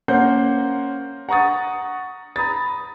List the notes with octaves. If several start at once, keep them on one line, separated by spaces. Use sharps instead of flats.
A#3 C#4 C5 F#5 G6
F#5 A#5 C#6 D#6 A6
A#5 B5 D#6 A6